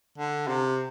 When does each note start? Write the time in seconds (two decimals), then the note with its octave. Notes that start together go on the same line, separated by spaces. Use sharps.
0.18 D3
0.48 C3